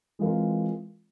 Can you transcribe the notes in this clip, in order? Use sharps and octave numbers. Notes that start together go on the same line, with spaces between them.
E3 G#3 C4 F4 A#4